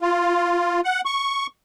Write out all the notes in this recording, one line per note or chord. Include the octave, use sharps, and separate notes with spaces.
F4
F#5
C#6